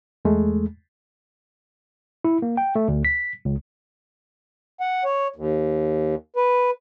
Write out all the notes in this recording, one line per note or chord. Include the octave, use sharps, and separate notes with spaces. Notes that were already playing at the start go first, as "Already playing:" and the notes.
E2 G#3 A3
E4
A#3
G5
A3
D2
B6
C#2
F#5
C#5
D#2
B4